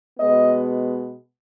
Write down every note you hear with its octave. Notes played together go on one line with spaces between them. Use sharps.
B2 G#3 B3 D#5